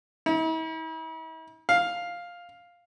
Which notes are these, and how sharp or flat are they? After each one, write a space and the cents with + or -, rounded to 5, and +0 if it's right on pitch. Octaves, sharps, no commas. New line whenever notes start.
E4 -45
F5 +5